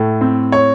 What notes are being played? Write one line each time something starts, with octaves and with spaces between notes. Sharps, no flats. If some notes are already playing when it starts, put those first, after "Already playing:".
Already playing: A2 A3
C4
C#5